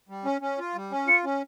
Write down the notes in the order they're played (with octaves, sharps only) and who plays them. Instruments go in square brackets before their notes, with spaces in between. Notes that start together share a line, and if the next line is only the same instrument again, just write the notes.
[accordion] G3
C#4
C#4
F4
G3
C#4
[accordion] F4 [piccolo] C#7
[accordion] C#4